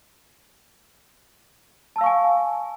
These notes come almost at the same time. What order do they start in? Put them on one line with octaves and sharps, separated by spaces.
A5 E6 F5 C#6 G#5